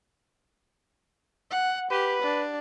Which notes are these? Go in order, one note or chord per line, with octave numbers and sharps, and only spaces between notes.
F#5
G4 B4
D4